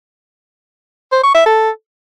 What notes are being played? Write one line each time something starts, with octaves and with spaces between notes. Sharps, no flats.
C5
C#6
E5
A4